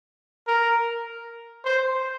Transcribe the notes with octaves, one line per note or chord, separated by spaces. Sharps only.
A#4
C5